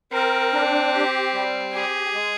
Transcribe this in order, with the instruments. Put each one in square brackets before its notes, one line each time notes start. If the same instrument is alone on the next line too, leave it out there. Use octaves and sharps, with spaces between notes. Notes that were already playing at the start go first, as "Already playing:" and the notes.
[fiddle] C4 [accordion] A#4
[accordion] D4
G4
G3
[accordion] G4 [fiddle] G#4
[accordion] G#3